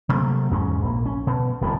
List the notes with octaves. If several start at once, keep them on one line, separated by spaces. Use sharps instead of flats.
C3 F#3 A3 A#3
E2 G#2 G#3 C#4
A#1 G#3 A#3
C#4
B2
D1 C2 F2 A2